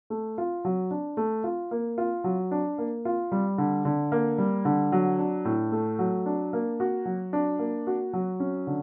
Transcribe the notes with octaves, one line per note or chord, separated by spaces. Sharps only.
A3
F4
F#3
D4
A3
F4
A#3
F4
F#3
D4
A#3
F4
G3
D3
D3
A#3
G3
D3
F#3
D4
A2
A3
F#3
D4
A#3
F#4
F#3
D4
A#3
F#4
F#3
C#4
D3